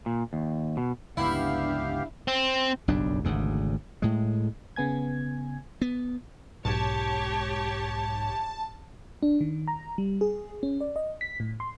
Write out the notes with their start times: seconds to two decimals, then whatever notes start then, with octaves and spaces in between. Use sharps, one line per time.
0.06 A#2
0.33 D#2
0.77 B2
1.17 C#2 G2 D3 B3 D4 E4 G4 F5
2.28 C4
2.88 F#1 B1 G2 D4
3.24 G#1 D2 C#3
4.02 A2 G#3
4.76 C#3 B3 G#5 G#6
5.82 B3
6.65 B1 G#2 G4 C#5 A5
9.23 D4
9.41 D#3
9.68 A#5
9.98 G3
10.21 G#4
10.63 C#4
10.81 D5
10.96 D#5
11.21 B6
11.40 A2
11.60 C6